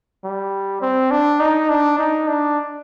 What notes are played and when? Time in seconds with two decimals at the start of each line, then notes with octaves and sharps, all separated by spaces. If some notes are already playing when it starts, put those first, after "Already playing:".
0.24 G3
0.82 C4
1.11 D4
1.40 D#4
1.69 D4
1.98 D#4
2.28 D4